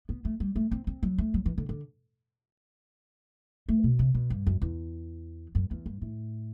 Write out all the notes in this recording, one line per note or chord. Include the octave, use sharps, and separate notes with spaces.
B3
A3
G3
A3
C4
C4
F#3
A3
F#3
E3
D3
D3
A3
B2
C3
B2
G2
F#2
E2
F#2
E2
G2
A2